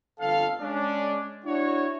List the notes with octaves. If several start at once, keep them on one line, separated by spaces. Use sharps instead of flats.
G1 F2 A4 F5
G#3 C#4 D4
D4 E4 F#4 C#5